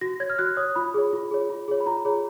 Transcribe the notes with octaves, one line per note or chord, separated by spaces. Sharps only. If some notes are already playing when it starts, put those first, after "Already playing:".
F#4 A#6
C#5 G#6
F6
F#4 F#6
C#5 D#6
F4 B5
G#4 C#5
F4
G#4 C#5
F4
G#4 C#5
B5
F4 A#5
G#4 C#5